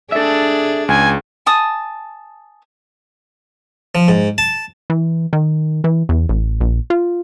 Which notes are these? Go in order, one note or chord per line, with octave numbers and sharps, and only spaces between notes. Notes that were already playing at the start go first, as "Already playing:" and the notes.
D4 G#4 A4 E5
C#2 G#5
G#5 A5 D#6
F3
G#2
A5
E3
D#3
E3
E2
A1
A#1
F4